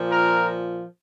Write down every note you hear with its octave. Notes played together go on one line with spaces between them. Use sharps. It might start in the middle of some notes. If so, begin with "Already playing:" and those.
Already playing: A#2 F3
A#4